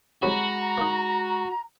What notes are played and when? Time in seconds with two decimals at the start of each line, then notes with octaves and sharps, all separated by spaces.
0.23 C2 F#3 G#3 F#4 A#5 B5
0.78 A#3 D#4